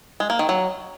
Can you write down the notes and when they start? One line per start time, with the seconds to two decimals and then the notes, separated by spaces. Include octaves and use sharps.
0.20 G#3
0.30 A#3
0.39 D#3
0.49 F#3